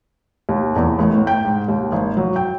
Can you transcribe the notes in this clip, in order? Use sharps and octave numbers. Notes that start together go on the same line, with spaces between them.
D#2
E2
A1
A2
G5
G#2
D#2
G#1
F#3
G5